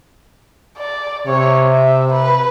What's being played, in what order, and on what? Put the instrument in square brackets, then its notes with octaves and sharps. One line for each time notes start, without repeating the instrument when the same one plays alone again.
[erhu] D5
[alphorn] C3 [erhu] C#5
[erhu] E5
B4